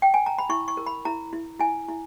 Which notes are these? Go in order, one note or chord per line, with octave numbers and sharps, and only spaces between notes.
G5
G#5
A#5
B5
E4 C#6
C#6
A#4
B5
E4 A#5
E4
E4 G#5
E4